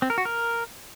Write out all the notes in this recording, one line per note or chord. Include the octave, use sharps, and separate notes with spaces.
C4
A#4
F#4
A#4